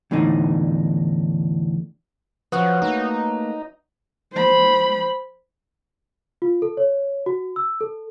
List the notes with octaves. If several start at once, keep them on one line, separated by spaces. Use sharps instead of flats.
E2 A2 D3 D#4
F3 F#3 F#4 B4 F#5 D#6 F#6
A3 A#3 D#4
C5 B5
F4
A4
C#5
F#4
E6
A4